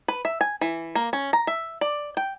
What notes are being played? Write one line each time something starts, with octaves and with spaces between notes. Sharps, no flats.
B4
E5
G#5
E3
A#3
C#4
A#5
E5
D5
G5